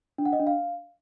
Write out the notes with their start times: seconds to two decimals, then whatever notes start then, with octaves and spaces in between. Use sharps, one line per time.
0.18 D4
0.26 F#5
0.33 D#5
0.40 D4
0.47 F5